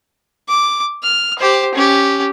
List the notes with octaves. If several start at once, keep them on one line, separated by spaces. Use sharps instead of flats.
D6
F6
G4 C5
C#4 G4